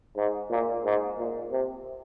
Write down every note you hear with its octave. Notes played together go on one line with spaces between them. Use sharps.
G#2
A#2
G#2
A#2
C3